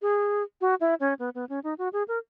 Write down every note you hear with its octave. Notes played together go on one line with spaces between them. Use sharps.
G#4
F#4
E4
C#4
B3
B3
C#4
D#4
F#4
G#4
A#4